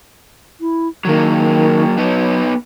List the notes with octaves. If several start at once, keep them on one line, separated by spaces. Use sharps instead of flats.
E4
D#3 F#3 A#3
F#3 B3 D#4